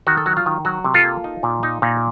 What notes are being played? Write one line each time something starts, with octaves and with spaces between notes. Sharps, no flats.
D#3 F#4
A4
F#3 F#4
F4
D#3
F#3 F#4
C3
F4 A4
A#3
D#4
A#2
D#4
A#2